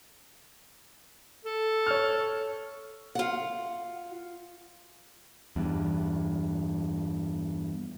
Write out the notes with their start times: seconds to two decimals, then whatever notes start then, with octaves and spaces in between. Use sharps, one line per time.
1.45 A4
1.87 C#5 F6
3.15 F4 F#5
5.56 E2 G2